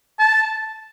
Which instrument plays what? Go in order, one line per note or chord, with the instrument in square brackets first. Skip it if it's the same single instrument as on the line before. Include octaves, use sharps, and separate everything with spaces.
[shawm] A5